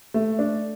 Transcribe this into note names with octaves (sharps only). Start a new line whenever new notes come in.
A3
D4